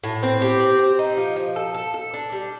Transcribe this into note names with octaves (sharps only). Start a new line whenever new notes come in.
A2
C4
G4
C4
C4
D#4
F3
F3
A4
A4
A4
D4
G3